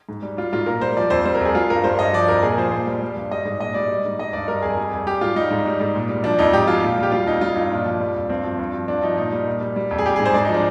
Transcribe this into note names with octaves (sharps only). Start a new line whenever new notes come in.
G#2
G3
G3 F4
G#2 F4
A#2 A#4
G3 C5
F3 D5
F2 C5
G3 C5
A#4
F2 G#4
G3 F4
G2 A#4
G3 C5
G2 D#5
F3 D5
F2 A#4
A#2 G#4
F3 C5
A#2 C5
G3
G3
G2
G3 D#5
G#2
A#2 D#5
G3 D5
G3
G#2
G3 D#5
G2 D5
G3 A#4
F2 G#4
G3
F2
G3 G4
G#2 F4
G3 D#4
G#2
G3
G#2
A#2
G3
F3 D4
F2 D#4
G#2 G4
F3 F4
A#2
G3
G4
G3 F4
F2 D#4
G3 F4
G2 D#4
A#2 D4
F3
G3
F2
G2 C4
F3
G2
F3
G2 D4
F3 D#4
A#2 D#4
G3
A#2
G3
G3
F2
G#4
G3 G4
G#4
G#2
C5
G#2 D5
D#4
F3
D4